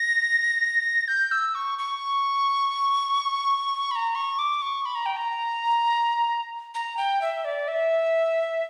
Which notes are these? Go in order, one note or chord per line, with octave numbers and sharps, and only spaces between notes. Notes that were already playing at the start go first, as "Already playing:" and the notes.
Already playing: A#6
G6
E6
C#6
C#6
B5
A#5
C#6
D6
C#6
B5
A#5
G5
A#5
A#5
G5
E5
D5
E5